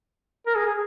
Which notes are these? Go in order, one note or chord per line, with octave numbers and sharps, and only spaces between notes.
A#4
G#4
G#4